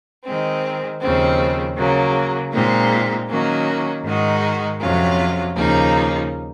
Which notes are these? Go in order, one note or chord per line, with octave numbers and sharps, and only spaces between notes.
D#3 G#3 C4
D#2 C#3 F3 C4
C#3 F#3 A#3
A#2 G#3 C4 D#4
D#3 F#3 A#3 C#4
G#2 D#3 G#3 D#4 F#4
F2 C3 F#3 C#4 F4
D#2 C#3 F3 A#3 D#4